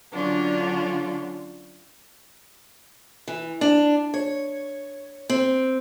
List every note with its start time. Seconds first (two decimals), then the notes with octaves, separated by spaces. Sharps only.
0.13 D3 F#3 C#4 D4 F4
3.28 E3
3.61 D4
4.14 C#5
5.30 C4